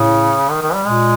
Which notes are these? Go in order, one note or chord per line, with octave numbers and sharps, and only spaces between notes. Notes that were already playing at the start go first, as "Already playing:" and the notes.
Already playing: A2 C#3
D#3
D#3
G3
A#2 G#3